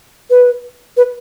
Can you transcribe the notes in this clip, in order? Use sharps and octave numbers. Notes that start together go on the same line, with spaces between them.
B4
B4